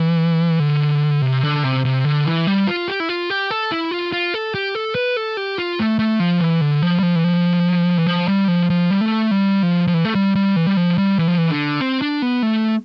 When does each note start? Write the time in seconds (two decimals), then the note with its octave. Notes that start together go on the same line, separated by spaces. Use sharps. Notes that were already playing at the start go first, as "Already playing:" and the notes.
Already playing: E3
0.60 D3
1.21 C3
1.43 D3
1.64 C3
1.85 C3
2.04 D3
2.26 E3
2.47 G3
2.67 F4
2.88 G4
3.00 E4
3.09 F4
3.30 G4
3.50 A4
3.72 E4
3.91 F4
4.12 F4
4.34 A4
4.55 G4
4.75 A4
4.95 B4
5.17 A4
5.37 G4
5.58 F4
5.79 A3
5.99 A3
6.20 F3
6.40 E3
6.61 D3
6.82 F3
6.99 G3
7.03 F3
7.15 E3
7.24 F3
7.98 E3
8.06 F3
8.28 G3
8.48 F3
8.70 F3
8.91 G3
9.01 A3
9.31 G3
9.63 F3
9.87 F3
9.94 E3
10.05 A3
10.15 G3
10.35 G3
10.56 E3
10.67 G3
10.77 F3
10.98 G3
11.19 E3
11.28 F3
11.38 E3
11.50 D3
11.81 C4
12.02 D4
12.22 B3
12.42 A3